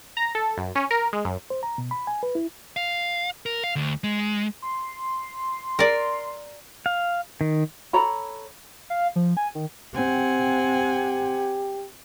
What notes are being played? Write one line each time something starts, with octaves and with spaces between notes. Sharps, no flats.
A#5
A4
F#2
C#4
A#4
G#3
F#2
C5
A#5
B2
B5
G#5
B4
E4
F5
A#4
F5
D2
G#3
C6
A#4 D5
F5
D#3
A4 C#5 A#5 B5
F5
F3
G#5
D#3
C4 G4 F#5 G#5